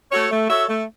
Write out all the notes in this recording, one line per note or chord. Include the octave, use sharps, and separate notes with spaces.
A3 F#4 A4 C#5
A3
F#4 A4 C#5 E5
A3